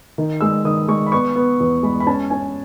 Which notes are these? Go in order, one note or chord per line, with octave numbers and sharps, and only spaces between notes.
D#3
G#3 E6
D#3 D#6
G#3 C#6
B5
B3 C#6
B3
E2
G#3 B5
B5
C#4 A5
C#4 G#5